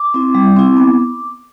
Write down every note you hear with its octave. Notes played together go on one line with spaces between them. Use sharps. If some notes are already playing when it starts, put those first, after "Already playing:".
Already playing: D6
C4 E4
G3
C4 E4
B3